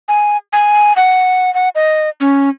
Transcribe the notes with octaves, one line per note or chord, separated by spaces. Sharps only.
G#5
G#5
F#5
F#5
D#5
C#4